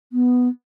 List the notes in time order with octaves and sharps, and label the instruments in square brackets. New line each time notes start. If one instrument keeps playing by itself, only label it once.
[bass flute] B3